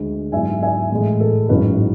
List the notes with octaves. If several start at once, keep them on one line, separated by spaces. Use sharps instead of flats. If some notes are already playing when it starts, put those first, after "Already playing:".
Already playing: D2 D3 G#3
G#2 F#3 B3 E4 E5 G#5
E5 G#5
A2 E3 G#3
A4
A1 G#2 F#3 C#4 E4 B4